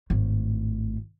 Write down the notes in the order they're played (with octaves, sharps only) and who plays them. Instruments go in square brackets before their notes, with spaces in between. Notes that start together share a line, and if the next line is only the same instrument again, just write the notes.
[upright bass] G#1 A2